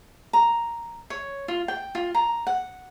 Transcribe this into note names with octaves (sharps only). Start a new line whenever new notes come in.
A#5
C#5
F4
G5
F4
A#5
F#5